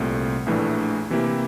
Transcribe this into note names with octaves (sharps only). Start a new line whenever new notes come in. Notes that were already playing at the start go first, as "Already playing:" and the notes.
Already playing: C2 A#2 A3 C4
A#1 A2 E3 A3 D4
C3 E3 A#3 E4 G4